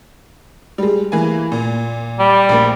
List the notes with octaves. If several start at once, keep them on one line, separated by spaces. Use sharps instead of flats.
G3 G#3
E3 A#3 G#5
A#2
G3
A#1 A#3